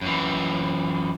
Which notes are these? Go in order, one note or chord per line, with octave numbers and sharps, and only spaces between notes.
F#2 E3